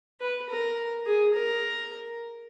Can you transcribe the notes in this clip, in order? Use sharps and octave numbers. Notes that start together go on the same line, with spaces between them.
B4
A#4
G#4
A#4